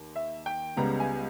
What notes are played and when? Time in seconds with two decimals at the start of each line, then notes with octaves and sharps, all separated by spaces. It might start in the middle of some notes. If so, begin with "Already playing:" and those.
Already playing: D#2
0.16 E5
0.46 G5
0.76 C#2 C#3 G3 B3 A#5
1.00 G#5